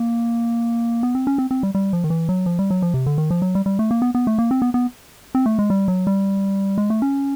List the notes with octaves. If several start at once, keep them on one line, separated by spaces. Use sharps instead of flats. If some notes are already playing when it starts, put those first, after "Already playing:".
Already playing: A#3
B3
C4
C#4
C4
C4
G3
G3
F3
D#3
E3
F#3
F3
G3
F#3
F3
C3
D3
D#3
F3
F#3
G3
G3
A3
A#3
B3
B3
A3
A#3
C4
B3
B3
C4
A3
G#3
G3
F#3
G3
G#3
A3
C#4